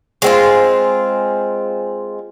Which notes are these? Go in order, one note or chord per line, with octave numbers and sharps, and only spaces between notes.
G#3 C4 F4